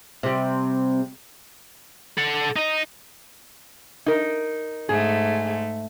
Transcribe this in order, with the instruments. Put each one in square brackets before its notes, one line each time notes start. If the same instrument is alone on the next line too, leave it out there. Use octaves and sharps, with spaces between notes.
[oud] C3 G3
[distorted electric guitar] A4 F#5
D#4 D#5
[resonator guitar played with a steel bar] D#4 A#4
[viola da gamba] G#2 A3 [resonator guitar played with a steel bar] G#4